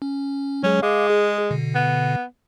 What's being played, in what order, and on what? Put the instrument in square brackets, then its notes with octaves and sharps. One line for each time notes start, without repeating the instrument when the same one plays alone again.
[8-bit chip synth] C#4
[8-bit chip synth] F#3 G#3 G#4 [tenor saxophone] C#4
[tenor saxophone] G#3 [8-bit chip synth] F5 D6
[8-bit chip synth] G#4
B2 D3
[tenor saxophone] B3